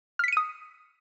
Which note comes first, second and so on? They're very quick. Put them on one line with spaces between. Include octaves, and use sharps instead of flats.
F6 B6 C#7 D#7 D#6